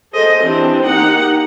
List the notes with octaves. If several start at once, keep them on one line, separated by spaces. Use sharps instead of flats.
G#4 A4 C5 D#5
E3 C4 D4 G4
A#3 D#4 G4 F#5